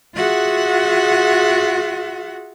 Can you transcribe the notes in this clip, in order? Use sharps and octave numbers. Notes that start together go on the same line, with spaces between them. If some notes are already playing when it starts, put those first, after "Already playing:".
F4 F#4 G#4 E5 F#5